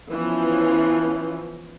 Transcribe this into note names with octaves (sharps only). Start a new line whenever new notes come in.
E3 F3 B3 C#4